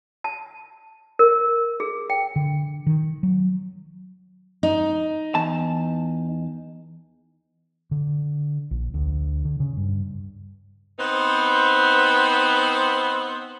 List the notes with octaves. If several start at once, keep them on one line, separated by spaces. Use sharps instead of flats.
A5
A#4
G#4
G5
D3
D#3
F#3
D#4
E2 A5
D3
A#1
D2
D3
C#3
G2
B3 C4 D#4 B4 C5